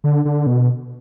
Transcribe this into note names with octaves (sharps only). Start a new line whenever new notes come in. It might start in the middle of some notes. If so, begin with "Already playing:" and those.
D3
D3
B2